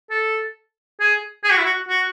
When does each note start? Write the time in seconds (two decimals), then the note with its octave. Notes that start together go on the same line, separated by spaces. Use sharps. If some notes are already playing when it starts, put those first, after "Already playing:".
0.10 A4
1.00 G#4
1.44 G#4
1.51 F#4
1.58 E4
1.65 F#4
1.89 F#4